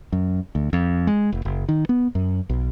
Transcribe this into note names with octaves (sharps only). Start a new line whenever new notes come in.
F#2
D2
F2
G#3
F1
F#1
D#3
B3
F#2
B1